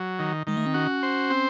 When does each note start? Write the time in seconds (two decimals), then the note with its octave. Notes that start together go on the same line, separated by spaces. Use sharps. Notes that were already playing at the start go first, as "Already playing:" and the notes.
Already playing: F#3
0.19 D#3
0.47 D#3 G#3
0.57 A3
0.66 C4
0.74 C#4 F#4
1.03 C5
1.30 C4